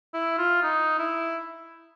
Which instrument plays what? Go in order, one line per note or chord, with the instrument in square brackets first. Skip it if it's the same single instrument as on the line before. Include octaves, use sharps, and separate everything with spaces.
[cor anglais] E4
F4
D#4
E4